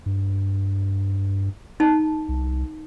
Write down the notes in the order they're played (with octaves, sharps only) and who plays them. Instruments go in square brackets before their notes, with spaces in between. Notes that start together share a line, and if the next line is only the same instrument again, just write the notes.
[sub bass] G2
[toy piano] D#4 A5
[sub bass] C2